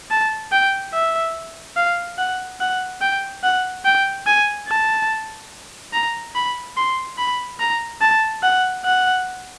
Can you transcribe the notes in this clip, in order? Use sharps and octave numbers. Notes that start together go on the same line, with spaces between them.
A5
G5
E5
F5
F#5
F#5
G5
F#5
G5
G#5
A5
A#5
B5
C6
B5
A#5
A5
F#5
F#5